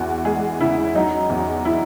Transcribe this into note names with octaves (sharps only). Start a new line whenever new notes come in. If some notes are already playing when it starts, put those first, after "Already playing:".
Already playing: E2 E3 F#4
G#3 G#4
C#3 E4
F#3 D#4
E2
E4